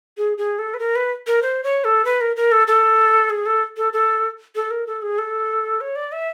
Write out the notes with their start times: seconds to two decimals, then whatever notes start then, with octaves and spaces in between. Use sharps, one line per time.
0.18 G#4
0.38 G#4
0.59 A4
0.74 B4
0.79 A#4
0.96 B4
1.27 A#4
1.42 C5
1.64 C#5
1.84 A4
2.05 B4
2.21 A#4
2.36 A#4
2.52 A4
2.67 A4
3.30 G#4
3.46 A4
3.77 A4
3.93 A4
4.56 A4
4.71 A#4
4.87 A4
5.02 G#4
5.18 A4
5.81 C#5
5.96 D5
6.12 E5